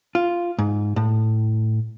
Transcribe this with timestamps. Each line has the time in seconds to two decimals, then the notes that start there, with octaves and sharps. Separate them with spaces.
0.15 F4
0.59 G#2
0.96 A2